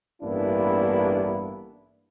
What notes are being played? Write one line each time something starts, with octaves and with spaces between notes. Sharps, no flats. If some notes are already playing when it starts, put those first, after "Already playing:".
A1 G2 A#3 B3 D4 E4